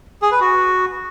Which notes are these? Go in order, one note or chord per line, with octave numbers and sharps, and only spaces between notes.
G#4
B4
F#4